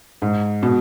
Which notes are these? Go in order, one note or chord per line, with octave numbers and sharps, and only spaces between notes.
G#2
B2